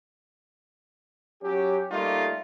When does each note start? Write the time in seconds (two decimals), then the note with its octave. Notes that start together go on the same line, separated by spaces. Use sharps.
1.43 F#3 C#4 G4
1.91 G3 A3 A#3 D#4 F4